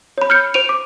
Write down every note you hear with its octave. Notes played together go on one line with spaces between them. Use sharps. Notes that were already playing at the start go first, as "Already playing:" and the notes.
C#5 B5
F6 G6 C#7
C5 D7 D#7 F7
D6